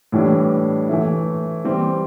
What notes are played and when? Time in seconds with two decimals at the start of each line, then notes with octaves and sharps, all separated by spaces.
0.12 A2 E3 G3 D4
0.89 E3 A3 E4
1.65 E3 G3 C4 G4